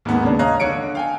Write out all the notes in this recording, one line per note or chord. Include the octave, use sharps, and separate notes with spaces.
D#2 G#2 A#3 B3
C#3 D4
C#5 D#5 F5 A#5 F#6
D3 C#5 C#7 D7
F5 G5 G#5